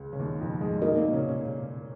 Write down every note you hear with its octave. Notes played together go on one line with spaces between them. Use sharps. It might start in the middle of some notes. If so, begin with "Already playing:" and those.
Already playing: C#2 C#3
C#3
D#2 D#3
F2 F3
G#2 G#3
A#2 A#3 D#4 F#4 A#4 D#5
A#2 A#3
C#3 C#4
C#3 C#4